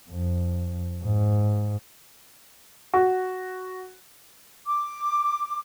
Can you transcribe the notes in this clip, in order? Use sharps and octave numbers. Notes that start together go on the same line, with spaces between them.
F2
G#2
F#4
D6